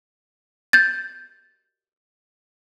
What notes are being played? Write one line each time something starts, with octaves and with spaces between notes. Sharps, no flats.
G6 A6